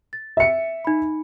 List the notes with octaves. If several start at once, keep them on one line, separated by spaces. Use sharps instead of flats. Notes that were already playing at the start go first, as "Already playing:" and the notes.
A6
E5 C#7
D#4 B5